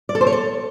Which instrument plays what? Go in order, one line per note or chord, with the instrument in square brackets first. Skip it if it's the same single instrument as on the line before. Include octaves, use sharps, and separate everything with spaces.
[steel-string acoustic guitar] D5
A4
C5
C#5
A4